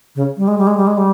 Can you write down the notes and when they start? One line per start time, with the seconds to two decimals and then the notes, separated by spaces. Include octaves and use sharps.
0.16 C#3
0.37 G3
0.48 G#3
0.58 G3
0.67 G#3
0.77 G3
0.87 G#3
0.97 G3